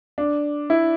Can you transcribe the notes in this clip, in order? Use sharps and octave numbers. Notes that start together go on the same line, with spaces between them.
D4
E4